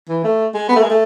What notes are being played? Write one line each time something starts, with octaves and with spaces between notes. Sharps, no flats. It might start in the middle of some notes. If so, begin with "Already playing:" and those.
E3
A3
G#3
B3
A3
G#3
A3